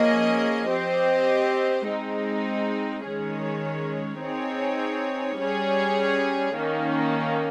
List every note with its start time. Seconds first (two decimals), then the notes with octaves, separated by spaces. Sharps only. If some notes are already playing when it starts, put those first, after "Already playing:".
Already playing: F3 A#3 C#4 G#4 D#5
0.70 C4 G4 C5 D#5
1.87 G#3 C4 D#4
3.05 D#3 G#3 C#4 G#4 C#5
4.21 C4 D#4 G#4 C#5
5.39 G3 C#4 G#4 C#5
6.56 D#3 A#3 C#4